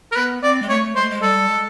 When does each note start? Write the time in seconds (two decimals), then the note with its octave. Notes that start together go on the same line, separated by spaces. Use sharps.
0.12 A#4
0.15 B3 B4
0.42 C4 D5
0.62 G#3
0.69 A3 C#5
0.96 G#3 C5
1.03 A3
1.10 G#3
1.22 G3 A4
1.49 G#3